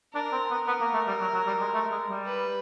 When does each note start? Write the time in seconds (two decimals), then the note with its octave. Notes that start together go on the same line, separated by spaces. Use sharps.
0.14 D4 A#4
0.32 C4
0.50 B3
0.67 B3 A#4
0.80 A#3
0.94 A3
1.07 G3
1.21 F#3
1.34 F#3
1.47 G3
1.61 G#3
1.74 A3
1.91 G#3
2.09 G3
2.26 B4